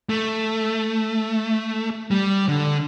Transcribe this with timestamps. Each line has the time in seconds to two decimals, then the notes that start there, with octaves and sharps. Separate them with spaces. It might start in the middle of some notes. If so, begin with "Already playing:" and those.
0.09 A3
2.11 G3
2.48 D3